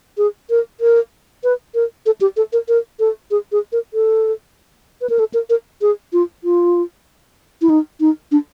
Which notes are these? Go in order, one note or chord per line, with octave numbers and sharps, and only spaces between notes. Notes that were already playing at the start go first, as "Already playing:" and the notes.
G#4
A#4
A#4
B4
A#4
A4
G4
A4
A#4
A#4
A4
G#4
G#4
A#4
A4
B4
A#4
A4
A#4
A#4
G#4
F4
F4
E4
D#4
D#4
D4